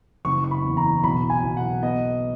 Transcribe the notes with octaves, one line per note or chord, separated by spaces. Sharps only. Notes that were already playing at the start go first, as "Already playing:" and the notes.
F#1 C#6
C#6
B5
E2
A#5
B1 B5
G#5
B1
F#5
B3 D#5